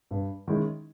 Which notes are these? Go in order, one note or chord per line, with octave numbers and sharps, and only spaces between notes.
G2
D#3 G#3 C#4 E4